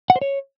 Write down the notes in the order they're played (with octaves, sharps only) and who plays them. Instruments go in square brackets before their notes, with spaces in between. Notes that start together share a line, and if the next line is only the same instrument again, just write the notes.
[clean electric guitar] F#5
C5
C#5